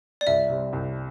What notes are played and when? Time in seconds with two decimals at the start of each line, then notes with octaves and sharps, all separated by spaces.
0.21 D5
0.27 C2 E5
0.50 C3 G3 C4
0.73 C2